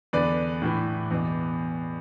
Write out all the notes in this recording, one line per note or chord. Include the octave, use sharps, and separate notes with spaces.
E2 D3 B4 D5
A2 E3
E2 B2